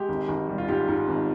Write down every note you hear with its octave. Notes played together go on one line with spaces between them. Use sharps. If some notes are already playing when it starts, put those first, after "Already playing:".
Already playing: G#3 G4
G#1
G#1
G3
F4
G#2 G4
G#2
G#1